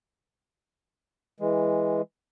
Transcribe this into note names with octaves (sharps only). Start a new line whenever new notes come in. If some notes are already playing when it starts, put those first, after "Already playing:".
E3 G#3